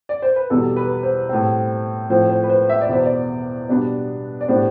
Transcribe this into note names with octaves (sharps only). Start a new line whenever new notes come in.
D5
C5
B4
E2 B2 G3 A4
B4
C5
A2 G3 C4
A2 F3 C4 C5
C5
B4
C5
E5
D5
E2 B2 B3 C5
D5
B2 G3 B3 D4 D5
D5
A2 G3 B3 D4 C5